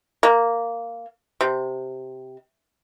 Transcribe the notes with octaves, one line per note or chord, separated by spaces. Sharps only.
A#3
C3